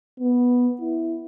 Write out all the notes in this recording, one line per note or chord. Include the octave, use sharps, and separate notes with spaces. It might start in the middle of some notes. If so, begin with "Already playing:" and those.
B3
E4